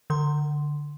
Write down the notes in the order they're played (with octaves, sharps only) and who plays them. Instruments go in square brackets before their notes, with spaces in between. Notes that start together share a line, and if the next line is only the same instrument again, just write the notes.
[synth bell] D3 C6